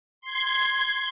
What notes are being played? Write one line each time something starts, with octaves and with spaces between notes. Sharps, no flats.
C6 G#6